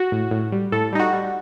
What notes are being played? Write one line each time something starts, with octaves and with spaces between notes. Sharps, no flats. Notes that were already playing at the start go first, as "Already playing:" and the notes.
Already playing: F#4
A2
A2
G3
A2 A4
G3 D#4
F#4
G3